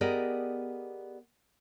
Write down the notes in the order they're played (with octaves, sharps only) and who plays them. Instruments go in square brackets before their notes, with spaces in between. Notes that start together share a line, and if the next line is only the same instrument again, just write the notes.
[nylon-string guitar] B3 G4 G#4 A#4 D5 D#5